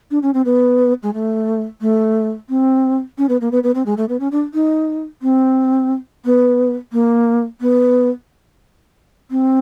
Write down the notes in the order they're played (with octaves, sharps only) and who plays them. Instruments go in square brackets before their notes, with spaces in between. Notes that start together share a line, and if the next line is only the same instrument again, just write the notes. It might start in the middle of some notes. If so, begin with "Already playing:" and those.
[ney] D4
C#4
C4
B3
G#3
A3
A3
C4
C#4
B3
A#3
B3
B3
C4
G#3
A3
B3
C#4
D4
D#4
C4
B3
A#3
B3
C4